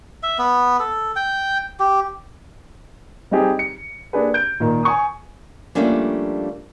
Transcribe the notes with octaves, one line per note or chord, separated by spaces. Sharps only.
E5
B3
A4
G5
G4
G3 C4 D#4 G4 G#4
C#7
A#3 D4 G4 G#4 B4
G6 D7
A#2 D#3
G#5 C#6 D#6
F3 G3 A3 A#3 C#4 D4